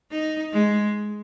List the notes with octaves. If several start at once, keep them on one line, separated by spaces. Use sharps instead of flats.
D#4
G#3